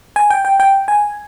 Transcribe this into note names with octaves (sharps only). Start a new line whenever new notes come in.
G#5
G5
G5
G5
G#5